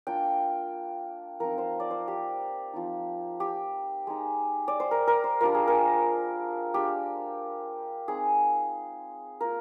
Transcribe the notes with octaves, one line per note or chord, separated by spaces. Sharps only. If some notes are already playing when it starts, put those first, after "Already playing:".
A#3 D4 F4 G5
F3 C4 D#4 A#4
C5
D5
C5
G4
F3 C4 D#4
G4
G#3 D#4
D5
C5
A#4
A#4
C5
G3 D4 F4 A#4
G#4
A#4
G#3 D4 F4 G4
G#3 C4 D#4 G#4
A#3 F4 A#4